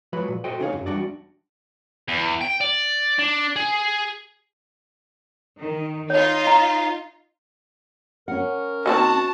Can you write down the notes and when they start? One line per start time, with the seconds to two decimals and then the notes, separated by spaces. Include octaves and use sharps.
0.13 F3 F#3 G#3 B4 B5
0.28 A#2
0.44 F#4 A4 C5 D#5 E5 G5
0.60 C#2 C#4 D#4 G#4 C#5 F5
0.73 F#2 F#3
0.86 E2 G3 D4 F#4 D5
2.08 E2
2.42 G5
2.61 D5
3.19 D4
3.56 G#4
5.58 D#3
6.10 D#4 F4 C#5
6.47 A#5
8.28 C#4 A#4 F#5
8.86 D#3 A#3 C4 F#4 A5